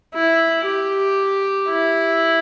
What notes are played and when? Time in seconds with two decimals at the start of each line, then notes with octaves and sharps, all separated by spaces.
0.14 E4
0.65 G4
1.69 E4